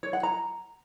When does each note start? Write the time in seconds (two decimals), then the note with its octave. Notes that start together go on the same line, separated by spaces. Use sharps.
0.03 C#5
0.13 F#5
0.23 A#5